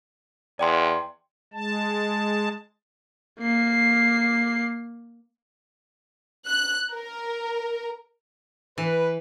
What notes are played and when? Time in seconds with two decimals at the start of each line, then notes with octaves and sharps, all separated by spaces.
0.59 E2 D5 G5 C6
1.53 G#3 A5
3.39 A#3 C7
6.48 F#6
6.93 A#4
8.78 E3 B4